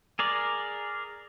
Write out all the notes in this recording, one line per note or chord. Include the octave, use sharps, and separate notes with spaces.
G#4 A#4 D5